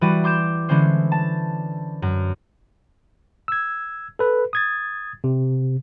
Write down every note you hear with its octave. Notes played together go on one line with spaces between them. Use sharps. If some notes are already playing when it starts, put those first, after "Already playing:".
E3 G3 F#4 B4 D5 D#7
C6 D6 G6 E7
D3 E3 G#3 C#4 C5
A5
F#2
E6 G#6
A4 B4
D#6 G#6 A6
C3